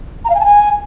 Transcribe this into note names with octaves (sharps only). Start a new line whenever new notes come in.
A#5
F5
G#5
A5
G#5